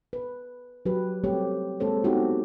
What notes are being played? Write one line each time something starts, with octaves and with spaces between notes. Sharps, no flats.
B4
F#3 G4 B4
G3 A3 C4 G4 C#5
G#3 A#3 C4 A4 C5 C#5
B3 C4 D#4 E4 F#4 G4